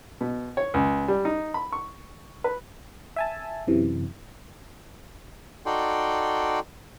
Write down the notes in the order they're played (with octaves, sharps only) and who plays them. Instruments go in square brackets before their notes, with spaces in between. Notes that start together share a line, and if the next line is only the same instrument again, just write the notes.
[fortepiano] B2
C#5
C#2
G3
D#4
B5
C#6
B4
[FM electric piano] E5 G#5 A5
F#2 C3 E3
[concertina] D#4 F#4 A4 D5 G5 C6